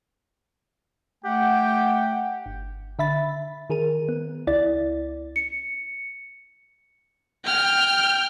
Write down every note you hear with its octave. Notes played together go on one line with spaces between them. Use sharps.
A3 G4 F#5 G5
G1
D3 E5 B5 A6
D#3 G#4 A#4 D#7
B3
C#2 E4 D5 A6
C#7
G5 F6